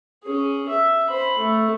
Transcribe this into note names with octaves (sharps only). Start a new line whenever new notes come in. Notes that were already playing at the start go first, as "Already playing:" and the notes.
C#4 G#4
E5
C5 B5
A3